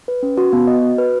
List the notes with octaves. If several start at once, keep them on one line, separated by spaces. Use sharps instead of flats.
B4
C#4
F#4
B3
D#5
F#4
B4